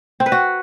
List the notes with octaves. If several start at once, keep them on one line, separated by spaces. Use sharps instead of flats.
C4
B4
F#4